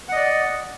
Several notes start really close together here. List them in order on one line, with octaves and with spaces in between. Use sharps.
F#5 D#5 D5